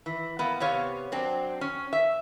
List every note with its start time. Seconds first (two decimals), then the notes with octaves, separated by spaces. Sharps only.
0.06 E3
0.39 A#3 B3
0.60 C3 B3 C#5 F5
1.12 F#3 C4 D4
1.61 C#4
1.93 E5